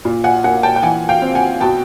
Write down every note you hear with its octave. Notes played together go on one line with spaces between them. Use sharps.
A#2
F#5 G#5
A#3 F#5 G#5
G5 A5
G5
E3 F#5 G#5
F5 G5
C4
F#5 G#5
B2 G5 A5